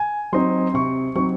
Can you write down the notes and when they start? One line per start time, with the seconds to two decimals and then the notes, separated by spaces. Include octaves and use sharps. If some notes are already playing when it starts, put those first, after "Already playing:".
Already playing: G#5
0.33 F#3 C4 D#4 C6
0.74 C3 C#6
1.15 F#3 C4 D#4 C#6